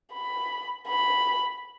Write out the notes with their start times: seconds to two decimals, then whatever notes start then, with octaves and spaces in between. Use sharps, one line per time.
0.13 B5
0.88 B5